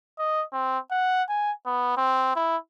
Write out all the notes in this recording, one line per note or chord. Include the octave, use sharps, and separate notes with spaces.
D#5
C4
F#5
G#5
B3
C4
E4